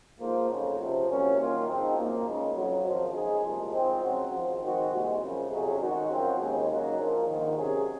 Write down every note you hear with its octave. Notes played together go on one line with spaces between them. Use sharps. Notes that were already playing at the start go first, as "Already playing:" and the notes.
G#2 F3 A#3 F4 C5
F2 C#3 F#3
C#2 C3 F3
C2 A#2 F#3 C#4
F#2 D#3 A#3 F4 A#4
G#2 F3 C4 D#4
F#2 F3 A#3
C#2 C#3 G#3 D#4
F2 C#3 F#3
G#1 F#2 F3
C#3 G#3 D#4 G#4
C2 A#2 F3 G#3
G#2 F3 G#3 C4
C#3 F#3 C4 F#4
G#1 G#2 F3
D#3 G#3 C4 F#4
C2 A#2 G#3
F#2 C#3 F3
F2 C3 F#3 C#4 G#4
D#3 G#3 D#4 F#4
F#2 F3 C4 F#4
D#2 C#3 G#3
C#3 F#3 A#3 D#4
A#1 A#2 F3 A#3
A#1 G#2 D#3
C3 F#3 C#4 G#4